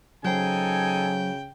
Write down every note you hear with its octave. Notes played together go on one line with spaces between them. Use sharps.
C#3 F#3 D#4 A4 C5 G5 G#5